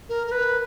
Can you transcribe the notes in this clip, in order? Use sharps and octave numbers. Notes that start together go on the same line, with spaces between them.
A#4
A#4
B4